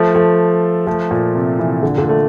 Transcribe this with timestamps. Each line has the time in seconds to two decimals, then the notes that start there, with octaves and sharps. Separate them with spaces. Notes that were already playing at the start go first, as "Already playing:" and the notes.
Already playing: F3 A3
0.15 F3 A3
0.87 F3 A3
1.11 A#2
1.35 C3
1.58 C3 E3
1.82 A#2 D3
1.98 A#2 D3
2.09 A3